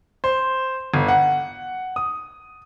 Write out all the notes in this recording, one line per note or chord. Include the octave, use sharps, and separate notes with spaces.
C5
G1
F#5
D#6